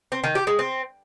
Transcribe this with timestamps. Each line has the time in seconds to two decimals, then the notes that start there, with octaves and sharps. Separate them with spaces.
0.12 C4
0.24 D#3
0.35 G4
0.47 G#3
0.59 C4